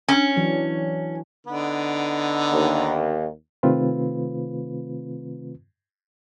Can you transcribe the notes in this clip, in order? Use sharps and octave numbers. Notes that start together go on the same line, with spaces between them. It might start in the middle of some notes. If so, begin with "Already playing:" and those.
C#4
E3 F#3 D4
D3 B3 D#4
D#2
C3 D#3 A3 C4 F4 B4